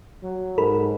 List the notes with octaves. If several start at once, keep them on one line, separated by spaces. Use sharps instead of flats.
F#3
G#2 A4 A#4 B5